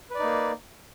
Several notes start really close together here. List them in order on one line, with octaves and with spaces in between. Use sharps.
B4 D5 D#4 A#3